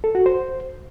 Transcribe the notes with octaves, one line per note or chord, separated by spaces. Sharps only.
A4
F#4
C5